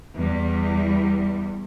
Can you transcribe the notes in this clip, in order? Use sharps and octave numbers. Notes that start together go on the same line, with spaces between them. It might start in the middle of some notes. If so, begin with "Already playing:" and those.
E2 G3